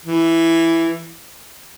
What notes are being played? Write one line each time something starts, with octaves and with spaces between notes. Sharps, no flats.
E3